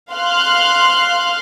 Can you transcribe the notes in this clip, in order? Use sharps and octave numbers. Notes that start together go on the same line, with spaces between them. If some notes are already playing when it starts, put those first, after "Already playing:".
F5 C6 F6 F#6